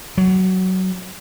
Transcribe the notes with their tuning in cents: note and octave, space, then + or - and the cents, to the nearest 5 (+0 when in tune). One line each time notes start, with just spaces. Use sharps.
F#3 +15